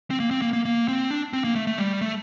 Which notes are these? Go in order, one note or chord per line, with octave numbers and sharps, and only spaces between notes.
C4
A#3
C4
A#3
A#3
A#3
C4
D4
C4
A#3
A3
A3
G3
A3